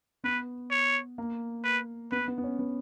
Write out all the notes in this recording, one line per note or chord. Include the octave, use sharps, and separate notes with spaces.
B3 B4
C#5
A#3
B4
B3 B4
B3
B3
C#4
B3